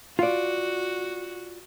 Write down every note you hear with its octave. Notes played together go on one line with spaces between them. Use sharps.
F4 F#4 D5